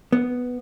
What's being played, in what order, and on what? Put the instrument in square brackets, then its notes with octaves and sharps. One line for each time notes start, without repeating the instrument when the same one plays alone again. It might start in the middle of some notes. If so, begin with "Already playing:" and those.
[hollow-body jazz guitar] B3